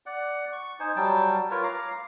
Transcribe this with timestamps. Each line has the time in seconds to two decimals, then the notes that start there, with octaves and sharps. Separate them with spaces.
0.06 D5 F#5
0.53 C#6
0.80 D#4 C5 G#5
0.96 F#3 G3 G5 A5
1.51 F4 A#4 B4 C#5
1.63 F5 A#5 D6